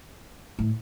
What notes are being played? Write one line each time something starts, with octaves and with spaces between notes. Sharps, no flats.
A2